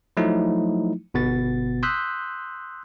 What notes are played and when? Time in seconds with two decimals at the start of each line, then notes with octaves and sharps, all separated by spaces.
0.17 F3 F#3 A3 D#4 E4
1.14 G1 B2 B3 A6
1.83 C6 D#6 E6 F#6 G6 B6